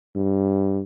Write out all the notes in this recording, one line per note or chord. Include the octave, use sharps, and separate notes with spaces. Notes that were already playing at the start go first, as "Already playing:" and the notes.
G2